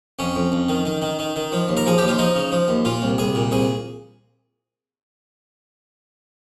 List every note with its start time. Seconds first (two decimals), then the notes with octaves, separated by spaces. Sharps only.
0.19 F2 C#4
0.35 F2
0.52 F2
0.69 D#3
0.86 D#3
1.02 D#3
1.19 D#3
1.36 D#3
1.52 F3
1.68 D#2
1.77 A#4
1.86 F3 G#4
1.98 D#2 G4
2.08 F4
2.18 F3 D#4
2.35 C#3
2.52 F3
2.68 D#2
2.85 A#2 F4
3.02 C2
3.18 C2 G#4
3.35 A#2
3.52 C2 G#4